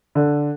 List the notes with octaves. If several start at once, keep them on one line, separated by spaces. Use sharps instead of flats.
D3